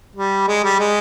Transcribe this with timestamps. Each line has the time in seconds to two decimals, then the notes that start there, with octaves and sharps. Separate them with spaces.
0.16 G3
0.48 G#3
0.64 G3
0.79 G#3